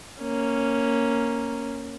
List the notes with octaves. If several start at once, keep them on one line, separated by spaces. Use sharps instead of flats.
A#3 C#4